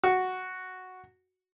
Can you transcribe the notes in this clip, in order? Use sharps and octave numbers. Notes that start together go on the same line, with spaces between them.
F#4